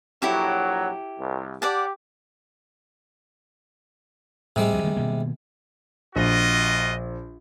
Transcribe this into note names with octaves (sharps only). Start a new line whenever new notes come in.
A#1 F#3 E4 G4 A4
C2
G4 D5 F#5 A5
A2 C3 G3 G#3
D2 F3
D#3 A3
B2 D#3 A#3
A#1 F4 F#4 D#5